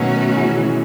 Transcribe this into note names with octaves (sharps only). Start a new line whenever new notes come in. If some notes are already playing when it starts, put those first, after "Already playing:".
Already playing: B2 D#3 F#3 A3 C#4 F#4
C#3 E3
C#3 E3